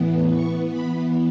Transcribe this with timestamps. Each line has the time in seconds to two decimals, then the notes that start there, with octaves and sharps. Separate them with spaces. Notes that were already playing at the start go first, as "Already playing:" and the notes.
Already playing: A2 E3 B3
0.31 E3 B3 C#6
0.70 B5